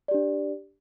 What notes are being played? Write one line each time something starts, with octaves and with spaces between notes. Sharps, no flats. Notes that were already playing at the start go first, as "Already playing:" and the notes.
D4 G4 D5